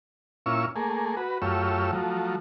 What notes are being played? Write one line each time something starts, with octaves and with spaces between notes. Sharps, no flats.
A#2 C#4 E4 F4 C#6 E6
A3 A#3 G#4
F#4 B4
F#2 A3 F4 G4 C#5 E6
F3 F#3 A3